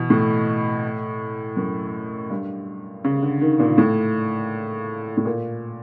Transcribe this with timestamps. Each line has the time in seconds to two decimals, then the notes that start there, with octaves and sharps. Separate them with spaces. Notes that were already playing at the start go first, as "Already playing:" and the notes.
Already playing: B2 E3
0.10 A2
1.57 F#2
2.30 G2
3.04 C#3
3.23 D3
3.41 D#3
3.60 A#2
3.78 A2
5.17 A2
5.25 A#2